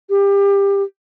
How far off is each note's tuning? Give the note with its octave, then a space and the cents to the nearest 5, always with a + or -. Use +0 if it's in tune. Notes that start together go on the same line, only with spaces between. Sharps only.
G4 +25